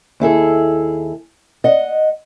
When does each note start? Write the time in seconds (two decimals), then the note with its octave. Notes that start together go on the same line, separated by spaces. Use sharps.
0.20 D#2 E4 G#4 A4
1.64 D#5 F#5